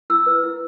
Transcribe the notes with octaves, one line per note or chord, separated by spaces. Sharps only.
E4 E6
B4
E4